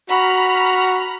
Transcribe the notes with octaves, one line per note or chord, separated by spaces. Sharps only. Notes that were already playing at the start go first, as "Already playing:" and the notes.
F#4 A#5 B5 F6